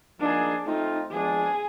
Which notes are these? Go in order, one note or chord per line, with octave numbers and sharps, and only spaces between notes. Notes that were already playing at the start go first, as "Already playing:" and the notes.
F3 A#3 D4 D#4 G#4
A3 C4 D#4 F4
F3 G#3 B3 D4 G#4